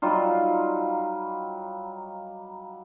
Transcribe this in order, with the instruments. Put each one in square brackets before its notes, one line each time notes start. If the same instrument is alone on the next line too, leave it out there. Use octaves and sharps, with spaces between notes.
[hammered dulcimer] F#3 G3 D#4 F4